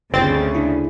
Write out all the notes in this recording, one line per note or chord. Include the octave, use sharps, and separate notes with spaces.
G1 D2 C#3 C4 A6
D4 E4